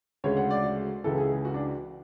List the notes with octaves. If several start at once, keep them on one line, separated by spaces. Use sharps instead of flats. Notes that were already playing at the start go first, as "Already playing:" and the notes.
D2 C#3 G#3 C#5
F#5
D5
F#4
C#2 C#3 E3 A4
G#4
G#4
F#4
D4